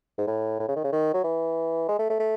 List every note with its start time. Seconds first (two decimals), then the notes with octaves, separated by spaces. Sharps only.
0.18 G#2
0.27 A2
0.60 A2
0.68 C#3
0.76 D#3
0.84 C#3
0.92 D#3
1.14 F#3
1.24 E3
1.89 G#3
1.99 A3
2.09 A3
2.20 A3